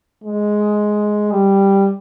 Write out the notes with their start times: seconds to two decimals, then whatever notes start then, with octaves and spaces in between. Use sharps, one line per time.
0.24 G#3
1.31 G3